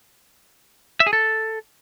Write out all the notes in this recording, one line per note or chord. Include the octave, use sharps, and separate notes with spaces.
E5
G#4
A4